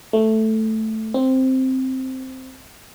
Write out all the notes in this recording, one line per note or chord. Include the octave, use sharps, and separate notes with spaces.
A3
C4